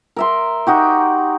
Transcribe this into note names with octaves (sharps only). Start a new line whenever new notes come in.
A#4 E5 C6
D#4 F#4 G4